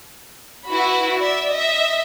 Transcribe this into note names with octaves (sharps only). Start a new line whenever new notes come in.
E4 F#4 B4 B5
D5 E5
D#5 E5